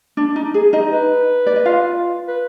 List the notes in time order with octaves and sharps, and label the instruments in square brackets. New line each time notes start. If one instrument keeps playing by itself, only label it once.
[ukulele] D4
D#4
G#4
D#4 D#5
[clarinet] B4
[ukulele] D5
D#5
F4 F5
[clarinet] B4